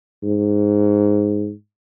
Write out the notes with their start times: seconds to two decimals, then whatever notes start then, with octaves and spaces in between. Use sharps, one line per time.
0.23 G#2